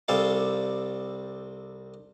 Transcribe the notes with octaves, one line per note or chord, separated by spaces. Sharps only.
C2 G3 C4 A4 F5 A5